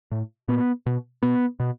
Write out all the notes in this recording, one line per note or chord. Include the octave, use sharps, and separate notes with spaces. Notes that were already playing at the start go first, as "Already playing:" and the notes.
A2
A#2 B3
B2
B2 B3
B2